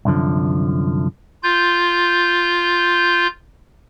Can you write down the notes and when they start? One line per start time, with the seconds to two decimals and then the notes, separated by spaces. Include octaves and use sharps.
0.05 C2 F#2 D3 F3
1.43 F4 G6